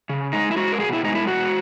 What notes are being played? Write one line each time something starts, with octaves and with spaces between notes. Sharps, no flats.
C#3
G#3 D#4
E4
G#3 F#4
A#4
B2 G#4
E4
G#3 D#4
E4
B2 F#4